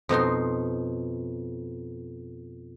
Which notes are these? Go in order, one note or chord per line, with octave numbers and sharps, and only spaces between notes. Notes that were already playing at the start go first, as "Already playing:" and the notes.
F2 B2 D#4 C6